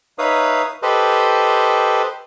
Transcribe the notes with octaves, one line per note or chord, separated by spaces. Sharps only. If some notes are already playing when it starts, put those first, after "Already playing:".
D#4 B4 C#5 E5 F5 D#6
G4 A4 B4 C5 D#5